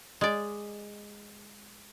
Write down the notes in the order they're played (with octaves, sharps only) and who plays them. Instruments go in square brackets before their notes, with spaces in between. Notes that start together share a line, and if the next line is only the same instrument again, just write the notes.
[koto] G#3 D5